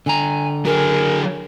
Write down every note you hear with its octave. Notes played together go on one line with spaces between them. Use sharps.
D3 G#5 A#5
F#3 G#4 A#4